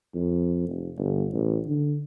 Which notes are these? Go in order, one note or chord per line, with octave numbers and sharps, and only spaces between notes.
F2
F1
G1
A1
D3